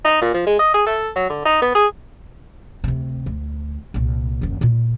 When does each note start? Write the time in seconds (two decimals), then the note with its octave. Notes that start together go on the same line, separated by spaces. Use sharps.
0.04 D#4
0.21 A#2
0.34 F3
0.46 G#3
0.59 D#5
0.74 G#4
0.86 A4
1.16 F#3
1.30 D3
1.45 D#4
1.62 B3
1.75 G#4
2.84 D2 C3
3.26 D2
3.94 C2 A#2
4.41 F#1 D#2
4.61 A#2 F4